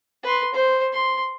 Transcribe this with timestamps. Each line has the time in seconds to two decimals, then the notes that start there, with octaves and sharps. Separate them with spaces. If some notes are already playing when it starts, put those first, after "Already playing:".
0.23 B4 C6
0.54 C5
0.92 C6